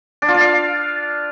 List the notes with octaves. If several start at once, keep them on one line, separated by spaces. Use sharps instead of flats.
D4
F4
D5
F5